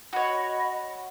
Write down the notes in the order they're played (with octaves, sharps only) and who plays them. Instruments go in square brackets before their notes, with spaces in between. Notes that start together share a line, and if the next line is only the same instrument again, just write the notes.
[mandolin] F#4 C#5 [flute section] D#5 B5